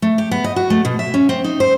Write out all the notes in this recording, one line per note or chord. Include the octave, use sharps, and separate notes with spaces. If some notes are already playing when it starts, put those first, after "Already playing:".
A3
G4
B3
D#5
F#4
A3
B2
E5
C#4
C4
D#4
C5